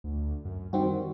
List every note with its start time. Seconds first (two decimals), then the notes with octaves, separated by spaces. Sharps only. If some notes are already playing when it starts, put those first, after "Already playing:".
0.04 D2
0.45 F#2
0.73 D#3 G3 C4 F#4